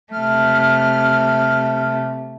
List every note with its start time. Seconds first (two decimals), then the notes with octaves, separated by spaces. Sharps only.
0.13 C3 A3 F6